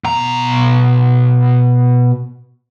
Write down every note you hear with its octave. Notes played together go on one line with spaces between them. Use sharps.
B2 A#5